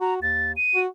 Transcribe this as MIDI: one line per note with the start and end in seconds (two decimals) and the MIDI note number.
0.01 0.19 66
0.01 0.14 82
0.22 0.55 39
0.22 0.52 93
0.57 0.80 99
0.75 0.87 66